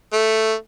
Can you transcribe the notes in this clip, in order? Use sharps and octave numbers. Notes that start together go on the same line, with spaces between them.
A3